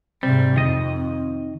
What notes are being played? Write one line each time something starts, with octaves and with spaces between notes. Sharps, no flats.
G#2 C3 G3 C4
F2 D#3 D#5